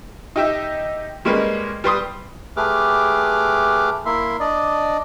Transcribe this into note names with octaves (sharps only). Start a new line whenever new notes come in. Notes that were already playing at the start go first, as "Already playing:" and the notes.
D#4 G4 E5
G3 G#3 A#3 C#4 B4
G3 B4 C6 D#6
A3 G4 G#4 B4 D6 F6
A#3 E4 E5 C6
D4 D5 D#5